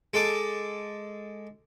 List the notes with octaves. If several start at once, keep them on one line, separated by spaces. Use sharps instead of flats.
G#3 A4 D6